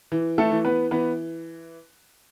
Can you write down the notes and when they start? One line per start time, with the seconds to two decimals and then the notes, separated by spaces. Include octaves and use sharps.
0.12 E3
0.38 A3 A4
0.51 E3
0.65 B3 B4
0.91 E3 B3 B4